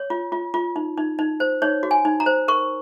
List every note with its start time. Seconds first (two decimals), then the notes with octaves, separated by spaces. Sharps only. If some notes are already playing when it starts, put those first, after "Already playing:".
Already playing: C#5
0.10 F4
0.32 F4
0.54 F4
0.76 D#4
0.97 D#4
1.19 D#4
1.40 C5
1.62 D#4 C#5
1.83 F#4
1.91 G#5
2.05 D#4
2.20 A#5
2.26 C5
2.48 A#4 C#6